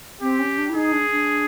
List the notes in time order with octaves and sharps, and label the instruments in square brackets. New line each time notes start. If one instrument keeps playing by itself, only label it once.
[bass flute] C4 [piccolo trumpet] G4
[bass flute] C#4
D4
E4
[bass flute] D#4 [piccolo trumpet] G#4
[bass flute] D4
D4